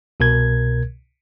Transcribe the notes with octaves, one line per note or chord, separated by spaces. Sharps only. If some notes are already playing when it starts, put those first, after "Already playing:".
C2 B2 A#4 G#6